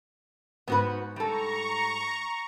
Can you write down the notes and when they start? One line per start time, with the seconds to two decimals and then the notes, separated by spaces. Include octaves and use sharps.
0.68 G#2 B3 D#4 F#4 B4
1.16 G3 A4 A#5 C#6